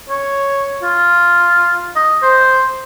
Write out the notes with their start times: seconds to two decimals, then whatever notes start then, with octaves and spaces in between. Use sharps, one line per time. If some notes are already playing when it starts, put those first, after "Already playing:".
0.10 C#5
0.82 F4
1.96 D#5
2.23 C5